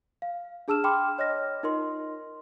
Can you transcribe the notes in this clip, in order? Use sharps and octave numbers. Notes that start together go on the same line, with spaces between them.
F5
D4 G#4 A5 E6 F6 E7
G5 B5 C6 D6 F6
C#5 D#5 F6 A#6
D#4 F4 A#4 D#5 C6